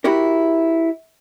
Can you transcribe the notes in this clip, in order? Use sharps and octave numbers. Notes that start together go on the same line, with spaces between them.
E4 F#4 G4 A#4